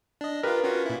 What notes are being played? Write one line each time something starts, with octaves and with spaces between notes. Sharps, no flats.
D4 D#5
F4 G4 A#4 B4
C#4 F4 F#4
A#2 E4